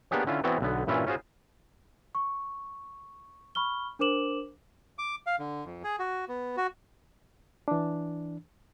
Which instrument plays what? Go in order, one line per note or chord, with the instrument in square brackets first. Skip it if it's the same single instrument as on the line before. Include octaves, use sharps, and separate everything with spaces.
[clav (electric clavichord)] A#3 B3 D4 G4 G#4 C#5
D3 C#4 E4 F4
E3 B3 C4 F#4 C#5 D5
B1 D3 B3
G2 A#2 E3 C#4 E4 F4
C#4 F4 F#4 G#4 C5
[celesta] C#6
B5 C#6 F6 G7
D4 A#4 C5 D6 E7 F#7
[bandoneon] D6
F5
D3
F2
G#4
F#4
B3
F#4
[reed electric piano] E3 D4